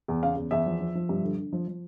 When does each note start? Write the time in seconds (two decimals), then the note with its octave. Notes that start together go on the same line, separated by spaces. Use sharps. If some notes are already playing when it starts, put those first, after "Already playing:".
0.08 E2
0.23 C#3 F5
0.37 E2
0.51 E2 E5
0.66 F3
0.80 F3
0.95 F3
1.09 G2
1.24 D3
1.38 D3
1.53 F3
1.68 F3